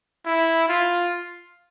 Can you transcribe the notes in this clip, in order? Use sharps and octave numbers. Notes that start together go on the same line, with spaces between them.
E4
F4